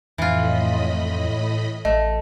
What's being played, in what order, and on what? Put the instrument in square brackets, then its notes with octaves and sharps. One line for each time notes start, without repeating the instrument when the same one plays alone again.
[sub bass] F2 [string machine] A2 D#5 B5 [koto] E3 F4
[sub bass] A1 [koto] A3 [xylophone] D#5